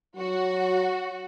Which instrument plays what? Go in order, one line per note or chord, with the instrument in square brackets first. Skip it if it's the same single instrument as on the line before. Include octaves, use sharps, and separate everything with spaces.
[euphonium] F#3 [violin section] F#4